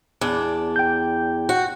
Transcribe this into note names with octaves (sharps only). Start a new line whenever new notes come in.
E2 D4
G5 G6
F#4